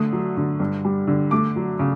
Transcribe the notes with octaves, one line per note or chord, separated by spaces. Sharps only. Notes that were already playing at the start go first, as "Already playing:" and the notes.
Already playing: D3 A3 D#6
F#3
D3
G2
G3
D3
A3 D6
F#3
C#3